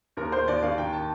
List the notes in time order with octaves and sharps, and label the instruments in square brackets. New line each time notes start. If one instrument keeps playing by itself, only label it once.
[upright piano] D#2 A#4
D#2 C5
D#2 D5
D#2 F5
D#3 G5
A5